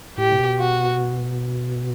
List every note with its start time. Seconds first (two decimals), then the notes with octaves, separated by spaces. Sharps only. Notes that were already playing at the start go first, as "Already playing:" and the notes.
0.18 A2 G4
0.32 C3
0.38 B2
0.59 F#4